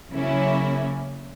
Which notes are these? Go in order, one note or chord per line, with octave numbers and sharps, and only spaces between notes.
C#3 F#3 A#3 C#4 E4